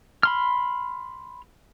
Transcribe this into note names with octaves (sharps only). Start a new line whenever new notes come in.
B5 C6 F6